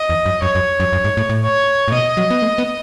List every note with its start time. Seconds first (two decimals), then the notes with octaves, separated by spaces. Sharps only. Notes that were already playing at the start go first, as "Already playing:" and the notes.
Already playing: D#5
0.10 E2
0.26 F#2
0.42 F#2 C#5
0.55 F#2
0.80 F#2
0.93 F#2
1.04 G#2
1.17 A2
1.29 A2
1.42 C#5
1.88 A2
1.92 B2 D#5
2.17 F#3
2.30 B3
2.42 A3
2.58 B3